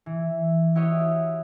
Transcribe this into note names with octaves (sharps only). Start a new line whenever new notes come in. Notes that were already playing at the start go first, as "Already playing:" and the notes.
E3
E4 F#4 G4 C#5 D#5